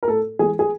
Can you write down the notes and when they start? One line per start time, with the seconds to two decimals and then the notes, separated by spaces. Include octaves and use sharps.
0.03 A#4
0.07 A2 A4
0.39 E3 G#3 G#4
0.59 G#4